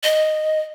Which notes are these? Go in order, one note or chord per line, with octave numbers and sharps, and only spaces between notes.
D#5